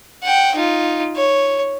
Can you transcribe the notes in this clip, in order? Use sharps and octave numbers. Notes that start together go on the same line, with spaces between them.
F#5 G5
D#4 F4
C#5